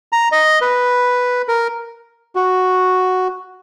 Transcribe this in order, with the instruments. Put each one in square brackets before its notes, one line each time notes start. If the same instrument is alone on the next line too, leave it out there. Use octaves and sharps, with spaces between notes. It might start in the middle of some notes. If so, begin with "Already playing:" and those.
[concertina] A#5
D#5
B4
A#4
[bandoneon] F#4